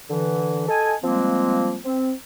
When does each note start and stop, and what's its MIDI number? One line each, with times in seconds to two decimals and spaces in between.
0.10 0.68 50
0.10 0.68 52
0.69 0.95 69
0.69 0.95 75
0.69 0.95 80
1.03 1.78 53
1.03 1.78 55
1.03 1.78 56
1.03 1.78 58
1.03 1.78 60
1.85 2.12 60